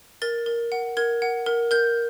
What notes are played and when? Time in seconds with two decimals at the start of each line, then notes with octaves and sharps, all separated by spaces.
0.22 A#4 A6
0.46 A#4
0.72 F#5
0.97 A#4 G#6
1.22 F#5
1.46 A#4
1.71 A#4 G6